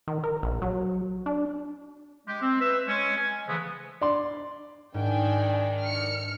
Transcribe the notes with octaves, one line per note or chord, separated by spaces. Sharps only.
D#3
A#4
A#1
F#3
D4
G#3 G4
C4
B4 E5
G#3 C#4
G#5
C#3 E3 F3 G#3 A3 B3
D5 C6
G#2 D#3 D4 G5 G#5
F6 C#7